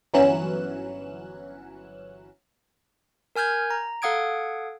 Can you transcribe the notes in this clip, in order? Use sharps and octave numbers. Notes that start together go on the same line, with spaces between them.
G1 E3 F#3 C#4 F#6 E7
A#4 G#5 F6 G6 G#6
A#5
A4 F5 F#5 D#6 G#6 D7